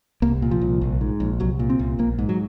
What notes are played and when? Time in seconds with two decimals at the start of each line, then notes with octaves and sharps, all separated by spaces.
0.22 C2 A#3
0.42 A#2
0.51 F3
0.61 C2
0.81 A#1
1.01 G#2
1.20 A#1
1.40 C2 F#3
1.59 A#2
1.70 C4
1.79 C2
1.99 A#1 A#3
2.19 G#2
2.29 F#3